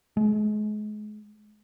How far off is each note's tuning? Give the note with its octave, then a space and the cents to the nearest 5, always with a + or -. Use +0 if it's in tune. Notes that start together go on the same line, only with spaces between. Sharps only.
G#3 +35